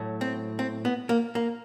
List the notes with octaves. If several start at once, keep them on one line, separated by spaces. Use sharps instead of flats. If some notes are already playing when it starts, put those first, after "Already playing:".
Already playing: A2 F#3 A3
C4
C4
B3
A#3
A#3